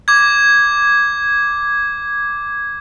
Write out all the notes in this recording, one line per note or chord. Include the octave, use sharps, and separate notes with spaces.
D6 G#6